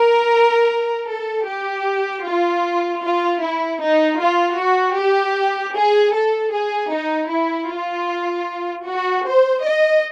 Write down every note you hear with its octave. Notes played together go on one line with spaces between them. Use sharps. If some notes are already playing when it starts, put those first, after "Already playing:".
Already playing: A#4
A4
G4
F4
F4
E4
D#4
F4
F#4
G4
G#4
A4
G#4
D#4
E4
F4
F#4
C5
D#5